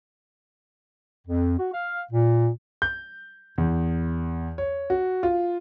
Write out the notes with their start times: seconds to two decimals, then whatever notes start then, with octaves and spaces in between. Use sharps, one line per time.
1.27 F2
1.59 F#4
1.73 F5
2.12 A#2
2.82 G6
3.58 E2
4.58 C#5
4.90 F#4
5.23 F4